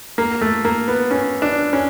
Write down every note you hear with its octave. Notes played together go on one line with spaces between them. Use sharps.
A#3
A3
A#3
B3
C#4
D4
C#4